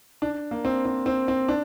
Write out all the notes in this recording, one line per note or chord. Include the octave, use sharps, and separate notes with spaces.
D4
A#3
C4
C4
C4
C4
D4